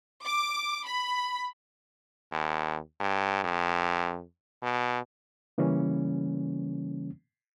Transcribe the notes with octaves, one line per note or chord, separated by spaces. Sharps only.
D6
B5
D#2
G2
F2
B2
C#3 E3 G3 A#3 C#4